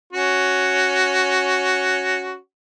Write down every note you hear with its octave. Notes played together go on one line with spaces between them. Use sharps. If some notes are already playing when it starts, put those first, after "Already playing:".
C#4 F#4